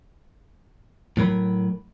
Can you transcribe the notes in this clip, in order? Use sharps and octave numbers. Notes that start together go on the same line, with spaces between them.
A2 F#3 A#4 B5